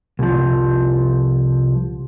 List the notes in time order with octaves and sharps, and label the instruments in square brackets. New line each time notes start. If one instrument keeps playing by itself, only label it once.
[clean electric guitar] C2 F3